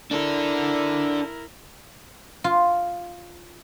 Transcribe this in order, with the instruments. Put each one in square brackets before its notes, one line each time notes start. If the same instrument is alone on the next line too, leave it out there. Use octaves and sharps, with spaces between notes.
[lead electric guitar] D4 A4 [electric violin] E4 A#4
[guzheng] F4